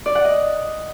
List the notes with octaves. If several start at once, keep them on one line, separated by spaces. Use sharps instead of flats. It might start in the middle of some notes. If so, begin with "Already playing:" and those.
D5
F#5
D#5